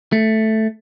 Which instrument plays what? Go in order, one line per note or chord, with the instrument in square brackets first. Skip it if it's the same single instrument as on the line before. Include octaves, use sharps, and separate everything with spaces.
[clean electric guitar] A3